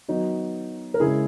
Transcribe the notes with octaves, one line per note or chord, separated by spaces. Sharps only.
D#3 F#3 B3 D#4 F#4
A#4
C#3 G#3 C#4 E4 G#4